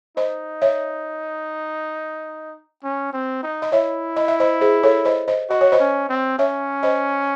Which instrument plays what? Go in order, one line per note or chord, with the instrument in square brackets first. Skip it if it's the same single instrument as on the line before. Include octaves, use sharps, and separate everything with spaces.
[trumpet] D#4 [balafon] C5 D#5
[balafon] C#5 E5
[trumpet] C#4
C4
D#4
[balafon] D#5
[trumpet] E4 [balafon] C#5 E5
[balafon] D#5
E5
C5 D#5
G#4 C5
A4 C#5
C5 D#5
C5 D#5
[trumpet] F#4 [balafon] D#5
[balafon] C#5
C5 D#5
[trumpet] C#4
C4
[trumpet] C#4 [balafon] C#5 E5
[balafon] C5 D#5